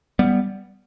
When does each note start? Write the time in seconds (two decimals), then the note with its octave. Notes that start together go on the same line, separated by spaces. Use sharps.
0.19 G3 B3